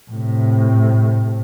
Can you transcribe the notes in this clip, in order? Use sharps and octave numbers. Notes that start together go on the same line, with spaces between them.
A2 C3